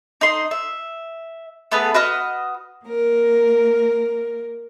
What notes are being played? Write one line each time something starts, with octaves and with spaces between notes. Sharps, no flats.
D#4 D#5 C6
E5
A3 B3 G#4 B4
F#4 B4 D#5 F6
A#3 A#4